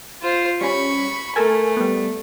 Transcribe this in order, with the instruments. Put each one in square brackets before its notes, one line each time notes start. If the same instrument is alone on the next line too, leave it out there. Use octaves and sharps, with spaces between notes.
[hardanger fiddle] F4 C5
[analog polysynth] G3 C#4 [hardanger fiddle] B5 C#6
[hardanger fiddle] A3 [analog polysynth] A4 A#4 G#5
[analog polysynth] G3 B3